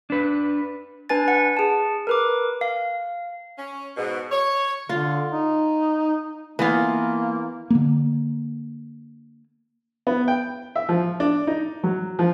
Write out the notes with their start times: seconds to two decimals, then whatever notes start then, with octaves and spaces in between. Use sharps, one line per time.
0.10 D4 B4
1.09 D4 B4 G#5 A6
1.28 F#5
1.57 G#4 A5
2.07 A#4 B4 D6
2.61 F5
3.58 C#4
3.97 G#2 B2
4.32 C#5
4.89 D3 F4
5.32 D#4
6.59 E3 A#3 B3 F4
7.70 D3 A#3
10.07 B3
10.28 G5
10.76 E5
10.89 F3
11.20 D4
11.47 D#4
11.83 F#3
12.19 F3